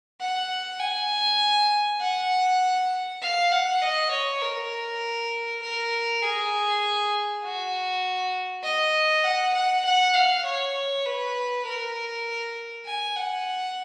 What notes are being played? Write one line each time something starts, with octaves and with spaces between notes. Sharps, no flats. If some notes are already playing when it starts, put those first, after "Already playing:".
F#5
G#5
F#5
F5
F#5
D#5
C#5
A#4
A#4
G#4
F#4
D#5
F#5
F#5
F#5
F5
C#5
B4
A#4
G#5
F#5